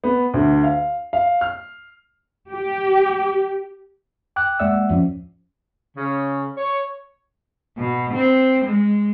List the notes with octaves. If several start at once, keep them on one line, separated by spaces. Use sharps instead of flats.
B3
D2
F5
F5
F6
G4
G5 D6 F#6
G#3 A#3 D5 E5 F#5 E6
F3 C#4
C#3
C#5
B2
C4
G#3